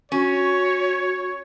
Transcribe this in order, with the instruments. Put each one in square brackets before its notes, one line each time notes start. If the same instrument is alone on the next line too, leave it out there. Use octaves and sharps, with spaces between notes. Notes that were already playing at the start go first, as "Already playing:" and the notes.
[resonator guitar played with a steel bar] C#4 [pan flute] F#4 [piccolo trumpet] C#5